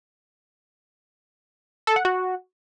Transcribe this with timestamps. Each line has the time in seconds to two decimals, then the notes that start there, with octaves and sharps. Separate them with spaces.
1.87 A4
1.96 F#5
2.05 F#4